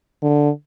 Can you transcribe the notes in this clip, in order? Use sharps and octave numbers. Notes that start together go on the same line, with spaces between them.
D3